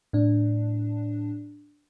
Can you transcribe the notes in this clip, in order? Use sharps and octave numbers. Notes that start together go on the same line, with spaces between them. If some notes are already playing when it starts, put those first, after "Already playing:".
A2 D4